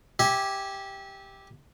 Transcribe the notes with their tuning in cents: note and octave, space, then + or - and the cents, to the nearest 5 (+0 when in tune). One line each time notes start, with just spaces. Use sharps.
G4 +0 E5 -30 G#5 -10